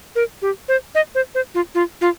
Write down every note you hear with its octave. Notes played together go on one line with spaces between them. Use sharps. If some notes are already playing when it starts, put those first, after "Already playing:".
A#4
G4
C5
D#5
C5
C5
F4
F4
F4